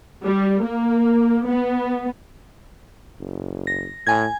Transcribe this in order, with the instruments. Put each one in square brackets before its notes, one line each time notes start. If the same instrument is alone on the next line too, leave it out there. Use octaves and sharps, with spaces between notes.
[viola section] G3
A#3
B3
[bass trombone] F#1
[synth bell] A#6
[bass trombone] A2 [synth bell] G#5 G#6